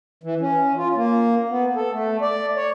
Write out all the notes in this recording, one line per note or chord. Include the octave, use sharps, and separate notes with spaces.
E3
C#4
F4
A#3
B3
A4
A3
D5
C#5